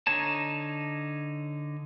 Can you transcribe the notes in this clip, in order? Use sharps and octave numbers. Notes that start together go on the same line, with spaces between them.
D3 D#4 C#5 A5